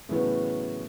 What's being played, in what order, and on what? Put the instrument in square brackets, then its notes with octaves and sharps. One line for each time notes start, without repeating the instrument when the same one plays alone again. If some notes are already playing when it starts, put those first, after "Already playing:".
[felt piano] A2 C#3 E3 F#3 A3 B3